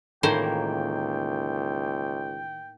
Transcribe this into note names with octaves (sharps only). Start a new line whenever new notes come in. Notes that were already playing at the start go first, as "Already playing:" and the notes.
C#2 A2 D#3 E3 A#3 C5 G5